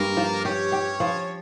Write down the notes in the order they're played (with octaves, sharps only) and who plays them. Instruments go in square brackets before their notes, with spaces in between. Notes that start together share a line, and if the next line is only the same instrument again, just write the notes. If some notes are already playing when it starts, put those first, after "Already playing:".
Already playing: [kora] G2 [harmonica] A#3 A#4
[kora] F3
[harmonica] C#4 C#5 [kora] G4
[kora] G4
F3